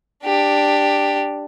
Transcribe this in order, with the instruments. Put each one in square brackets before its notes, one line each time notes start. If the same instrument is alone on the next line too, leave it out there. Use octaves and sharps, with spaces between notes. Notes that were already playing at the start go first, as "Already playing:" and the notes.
[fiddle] D4 G4